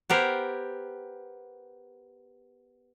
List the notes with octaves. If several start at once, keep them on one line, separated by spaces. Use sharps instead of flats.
B3 G4 A#4 C5